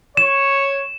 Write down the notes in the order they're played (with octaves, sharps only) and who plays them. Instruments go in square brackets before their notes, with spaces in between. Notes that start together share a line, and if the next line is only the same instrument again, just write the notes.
[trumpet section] C#5 [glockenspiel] E7